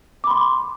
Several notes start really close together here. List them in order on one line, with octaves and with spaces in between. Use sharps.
D6 B5 C6